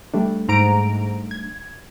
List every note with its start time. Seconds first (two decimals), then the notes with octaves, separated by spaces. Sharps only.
0.14 G3 A3 D4
0.49 G#2 A#5 D7
1.31 G#6